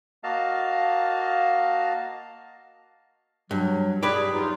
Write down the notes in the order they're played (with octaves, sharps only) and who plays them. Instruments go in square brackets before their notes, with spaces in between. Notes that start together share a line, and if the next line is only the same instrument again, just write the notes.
[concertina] A#3 F#4 D#5 F5 A5
[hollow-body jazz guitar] G2 [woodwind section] F#3
[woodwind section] G3 G#4 [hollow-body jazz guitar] G4 B4
[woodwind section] E2 D#4 F4